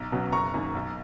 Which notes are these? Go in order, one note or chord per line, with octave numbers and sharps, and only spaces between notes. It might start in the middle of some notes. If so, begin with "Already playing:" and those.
Already playing: B1 A#5
B2 F#3 C#4
F#1 A#5 C#6
F#2 D#3 A#3
B1